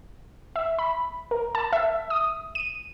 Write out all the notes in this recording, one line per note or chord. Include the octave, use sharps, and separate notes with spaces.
E5
B5
A#4
A5
E5
D#6
D#7